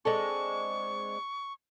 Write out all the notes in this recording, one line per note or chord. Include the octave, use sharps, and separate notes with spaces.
G#3 C4 D4 A4 C#6